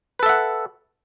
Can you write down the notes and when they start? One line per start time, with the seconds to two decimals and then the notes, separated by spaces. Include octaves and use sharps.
0.19 B4
0.23 A4
0.26 E5
0.29 F#5